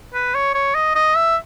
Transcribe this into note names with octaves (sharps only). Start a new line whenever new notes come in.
B4
C#5
C#5
D#5
D#5
E5